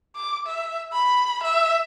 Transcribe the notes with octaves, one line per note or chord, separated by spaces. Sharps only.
D6
E5
B5
E5